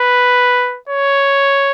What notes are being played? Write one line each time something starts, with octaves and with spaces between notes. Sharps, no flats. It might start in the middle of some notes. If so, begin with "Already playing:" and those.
Already playing: B4
C#5